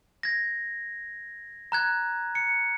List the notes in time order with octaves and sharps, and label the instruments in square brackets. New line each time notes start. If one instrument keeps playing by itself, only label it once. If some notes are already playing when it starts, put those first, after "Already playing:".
[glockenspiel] G#6 A#6
A#5 F#6 G#6
C#7